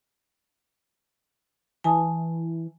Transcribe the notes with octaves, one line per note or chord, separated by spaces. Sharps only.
E3 G#5 A5 D#6